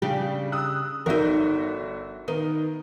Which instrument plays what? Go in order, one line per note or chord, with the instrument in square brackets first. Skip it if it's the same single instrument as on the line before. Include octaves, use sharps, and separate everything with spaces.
[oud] C#3 D4 G4 [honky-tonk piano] G3
[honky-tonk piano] D#6 E6 F#6
[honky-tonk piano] G1 F#4 E5 [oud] D#4 A#4
[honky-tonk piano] D#3 B3 A#4 [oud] D#4